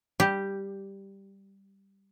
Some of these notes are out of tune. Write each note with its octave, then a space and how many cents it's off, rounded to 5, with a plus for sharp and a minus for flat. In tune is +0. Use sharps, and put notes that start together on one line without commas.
G3 +0 G4 +0